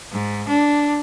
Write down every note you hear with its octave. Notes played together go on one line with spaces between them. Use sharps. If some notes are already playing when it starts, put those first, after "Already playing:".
G#2
D4